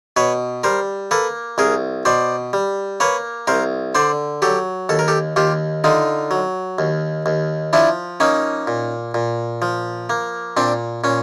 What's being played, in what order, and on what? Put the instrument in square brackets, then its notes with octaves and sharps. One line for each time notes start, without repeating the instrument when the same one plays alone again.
[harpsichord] B2 B4 C#5
G3 A#4 C5
A#3 A4 B4
C2 G#4 A#4
B2 C5 D5
G3
A#3 B4 C#5
C2 A#4 C5
D3 C5 D5
F#3 G4 A4
D#2 A4
A#4
G4 A4
D#2 F4 G4
D3 D#4 F4
F#3
D#2
D#2
F3 D4 E4
A#3 C#4 D#4
A#2
A#2
F3
A#3
A#2 C4 D4
A#2 C#4